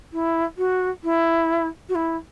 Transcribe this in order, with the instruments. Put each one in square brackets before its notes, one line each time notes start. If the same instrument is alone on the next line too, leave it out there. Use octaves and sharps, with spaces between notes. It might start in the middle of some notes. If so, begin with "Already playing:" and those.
[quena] E4
F#4
E4
F#4
E4